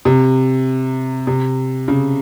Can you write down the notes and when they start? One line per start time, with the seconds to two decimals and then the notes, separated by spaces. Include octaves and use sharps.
0.05 C3
1.27 C3
1.88 C#3